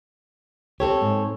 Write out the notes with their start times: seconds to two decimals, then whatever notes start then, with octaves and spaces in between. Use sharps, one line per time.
0.80 C4 G4 A4 C#5
1.02 G#2